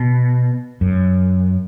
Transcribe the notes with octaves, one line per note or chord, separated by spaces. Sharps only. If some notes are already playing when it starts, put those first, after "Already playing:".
Already playing: B2
F#2